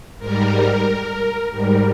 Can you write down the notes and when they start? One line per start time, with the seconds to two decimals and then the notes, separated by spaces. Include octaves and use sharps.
0.19 G#2 G3 A#4
1.51 G#2 G3 A#4